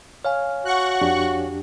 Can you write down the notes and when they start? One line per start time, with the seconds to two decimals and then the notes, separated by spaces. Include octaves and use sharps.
0.25 C#5 F5 G#5 F6
0.65 F#4 F#5 C#6 F#6
1.01 F2 D4 G4